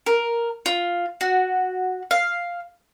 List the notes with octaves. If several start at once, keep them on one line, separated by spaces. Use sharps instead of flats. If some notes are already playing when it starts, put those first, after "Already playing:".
A#4
F4
F#4
F5